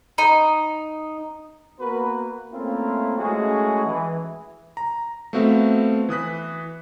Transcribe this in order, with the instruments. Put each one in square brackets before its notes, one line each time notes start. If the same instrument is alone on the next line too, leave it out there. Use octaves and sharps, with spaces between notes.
[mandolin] D#4
[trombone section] A#3 B3 F#4 A#4 B4
A3 A#3 C4 C#4 E4 F4
G#3 A3 C#4 E4 F#4 G#4
E3
[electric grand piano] A#5
A3 B3 C4 F#4 E5 F5
E3 D#6 F#6 B6